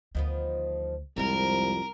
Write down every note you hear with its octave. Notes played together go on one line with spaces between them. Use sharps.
D2 D#3 F3 B3
C2 F2 F3 G#3 A#4